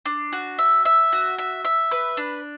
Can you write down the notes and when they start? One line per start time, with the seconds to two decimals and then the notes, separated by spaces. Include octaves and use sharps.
0.06 D4
0.33 F#4
0.59 E5
0.85 E5
1.12 F#4
1.38 E5
1.65 E5
1.91 B4
2.17 D4